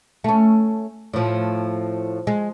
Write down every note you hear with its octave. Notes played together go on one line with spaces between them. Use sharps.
A3 C#4
A2 F3
G#3